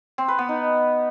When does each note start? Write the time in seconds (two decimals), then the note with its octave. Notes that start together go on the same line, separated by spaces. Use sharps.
0.18 C4
0.28 B4
0.39 B3
0.49 D#4